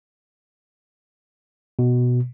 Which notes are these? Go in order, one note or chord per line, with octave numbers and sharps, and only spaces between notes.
B2